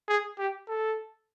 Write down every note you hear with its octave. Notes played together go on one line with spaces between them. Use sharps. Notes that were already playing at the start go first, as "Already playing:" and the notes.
G#4
G4
A4